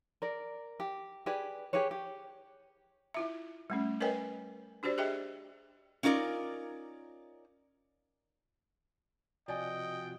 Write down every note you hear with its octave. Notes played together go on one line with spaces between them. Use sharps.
A#4 D5
G4
G4 G#4 B4 D5
G4 G#4 B4 C#5
G4
E4 F4 E5
G3 A3 C#4
A#4 B4 C#5 D#5 G5 G#5
D4 F#4 G4 C5 D5
G4 G#4 D#5 E5 G5
C#4 D#4 F4 A#4 D5
C3 F3 F#4 D5 D#5 G5 G#5